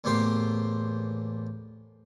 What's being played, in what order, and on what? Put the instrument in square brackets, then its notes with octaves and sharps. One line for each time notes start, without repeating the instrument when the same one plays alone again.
[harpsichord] E2 A2 A#3 G4 C5 C6